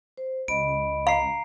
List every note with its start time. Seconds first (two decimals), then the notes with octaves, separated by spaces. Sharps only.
0.17 C5
0.48 C#2 D#5 B5 D7
1.07 F5 A#5 C7